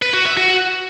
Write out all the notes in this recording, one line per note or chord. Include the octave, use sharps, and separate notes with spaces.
B4
F#4
E5
F#4